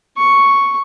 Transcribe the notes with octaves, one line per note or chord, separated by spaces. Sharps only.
C#6